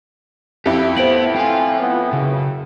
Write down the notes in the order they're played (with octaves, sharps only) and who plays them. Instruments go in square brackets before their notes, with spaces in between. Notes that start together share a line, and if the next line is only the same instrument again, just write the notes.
[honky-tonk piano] F2 E4 [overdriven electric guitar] G4
[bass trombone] A2 [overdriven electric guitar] B3 [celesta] C5 D7 F#7
[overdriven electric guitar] F4 F5 [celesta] G5 G#5
[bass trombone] B3
[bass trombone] F#1 [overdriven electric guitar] C#3